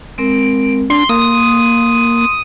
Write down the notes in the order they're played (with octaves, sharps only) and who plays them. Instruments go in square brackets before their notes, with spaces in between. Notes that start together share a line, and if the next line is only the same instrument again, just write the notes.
[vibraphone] G#3 C4 A#4 [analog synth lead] D7
[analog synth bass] D4 [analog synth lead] C6
[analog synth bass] A#3 [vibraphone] C6 [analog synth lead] D#6